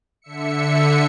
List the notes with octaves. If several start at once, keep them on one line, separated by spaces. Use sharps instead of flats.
D3 E5 C#7